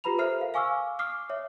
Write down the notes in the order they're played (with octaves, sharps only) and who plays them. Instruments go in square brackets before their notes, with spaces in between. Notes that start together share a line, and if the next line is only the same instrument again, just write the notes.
[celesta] F4 G4 B4 A#5 B5 F7
A4 A#4 C5 E5 F6 C7
F5
F5 G#5 C#6 D6 E6 F6
D6 D#6 F6 C7
C#5 E5